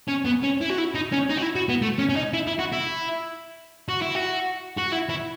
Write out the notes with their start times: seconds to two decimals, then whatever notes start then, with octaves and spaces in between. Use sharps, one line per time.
0.09 C#4
0.26 B3
0.44 C#4
0.61 E4
0.70 F#4
0.78 E4
0.95 D#4
1.13 C#4
1.30 D#4
1.38 F#4
1.42 E4
1.56 F#4
1.69 B3
1.82 A3
1.98 C#4
2.09 C#4
2.16 D#4
2.33 E4
2.47 E4
2.59 F#4
2.72 E4
3.89 F#4
4.02 E4
4.15 F#4
4.78 F#4
4.93 E4
5.10 E4